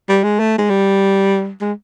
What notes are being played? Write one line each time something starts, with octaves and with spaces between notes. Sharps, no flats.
G3
G#3
A3
G#3
G3
G#3